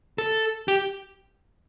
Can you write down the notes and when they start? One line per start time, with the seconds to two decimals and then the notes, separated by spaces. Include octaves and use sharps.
0.18 A4
0.68 G4